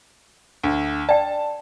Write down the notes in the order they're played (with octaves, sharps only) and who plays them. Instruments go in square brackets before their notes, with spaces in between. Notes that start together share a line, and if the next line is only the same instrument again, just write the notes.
[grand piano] D2
[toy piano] D5 G5 [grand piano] A5